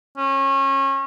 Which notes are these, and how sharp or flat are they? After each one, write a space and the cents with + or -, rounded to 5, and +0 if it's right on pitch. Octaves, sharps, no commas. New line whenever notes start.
C#4 -30